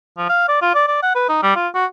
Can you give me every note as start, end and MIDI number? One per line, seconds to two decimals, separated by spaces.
0.17 0.27 53
0.29 0.47 77
0.49 0.60 74
0.62 0.74 65
0.74 0.85 74
0.88 1.02 74
1.03 1.11 78
1.15 1.27 71
1.29 1.41 63
1.43 1.55 55
1.56 1.68 65
1.74 1.85 66